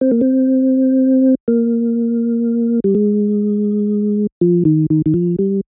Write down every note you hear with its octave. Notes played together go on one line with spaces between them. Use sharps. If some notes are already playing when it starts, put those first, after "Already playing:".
C4
A#3
C4
A#3
G3
G#3
F3
D#3
D#3
D#3
F3
G3